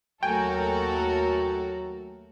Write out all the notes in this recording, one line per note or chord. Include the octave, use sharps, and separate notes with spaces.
D#2 F#3 A3 F#4 A4 A#4 G5 G#5